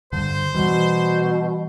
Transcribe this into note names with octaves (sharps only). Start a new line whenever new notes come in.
G2 D3 C5
B2 E3 G3